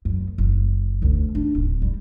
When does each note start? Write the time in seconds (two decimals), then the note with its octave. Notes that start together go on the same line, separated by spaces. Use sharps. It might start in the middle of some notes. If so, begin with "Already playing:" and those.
0.05 F#2
0.38 F#1
1.02 D2 D3
1.35 D4
1.55 D1
1.82 G3